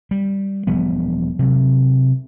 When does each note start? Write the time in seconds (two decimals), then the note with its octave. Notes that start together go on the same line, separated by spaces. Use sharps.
0.11 G3
0.67 E1 F3 G3 B3
1.39 C3 F#3